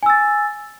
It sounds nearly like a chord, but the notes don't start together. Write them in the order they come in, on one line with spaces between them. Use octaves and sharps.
G#5 E6 A6